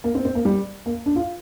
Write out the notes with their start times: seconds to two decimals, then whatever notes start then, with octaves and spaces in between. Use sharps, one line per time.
0.04 A#3
0.15 C4
0.25 C4
0.35 A#3
0.45 G3
0.86 A#3
1.06 D4
1.16 F4